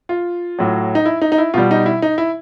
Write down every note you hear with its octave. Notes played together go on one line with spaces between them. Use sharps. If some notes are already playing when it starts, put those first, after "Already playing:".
F4
A2 F#3
D#4
E4
D#4
D#4
E4
B2 G3 F4
D#4
E4
D#4
E4